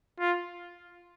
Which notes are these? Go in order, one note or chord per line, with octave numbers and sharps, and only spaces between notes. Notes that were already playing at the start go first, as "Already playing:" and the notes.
F4